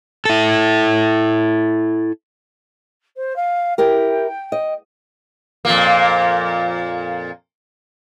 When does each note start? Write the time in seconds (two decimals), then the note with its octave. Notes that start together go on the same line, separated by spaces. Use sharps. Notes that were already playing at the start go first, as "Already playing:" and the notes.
0.25 E4 A4
3.17 C5
3.36 F5
3.78 E4 G4 A#4 G5
4.52 D#5
5.65 F2 A#2 A#3